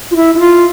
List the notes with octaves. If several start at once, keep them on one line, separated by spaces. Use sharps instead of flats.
F4
E4
E4
F4